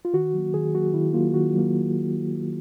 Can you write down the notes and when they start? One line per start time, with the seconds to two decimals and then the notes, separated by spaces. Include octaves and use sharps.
0.05 F4
0.13 D#3 F#4
0.34 F#3 A#3
0.54 D#3 G#4
0.75 F#3 A#3 F#4
0.94 D#3 E4
1.14 F#3 A#3 F4
1.33 D#3 F#4
1.54 F#3 A#3